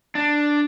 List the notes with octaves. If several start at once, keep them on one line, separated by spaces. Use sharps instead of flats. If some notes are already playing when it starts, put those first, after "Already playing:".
D4